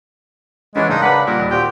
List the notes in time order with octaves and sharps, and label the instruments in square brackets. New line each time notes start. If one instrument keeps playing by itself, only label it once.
[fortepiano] E3 C#4 [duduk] G#3 [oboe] D4 [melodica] B4 F#5
[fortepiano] G#2 [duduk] C#3 [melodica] D4 A#4 [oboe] D#4
[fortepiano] B4 D5 F#5 [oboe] B5
[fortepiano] A#2 [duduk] G3 [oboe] A#4 [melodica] F#5
[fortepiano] D#2
[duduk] A#2 [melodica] C4 F#4 [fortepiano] G4 [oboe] G5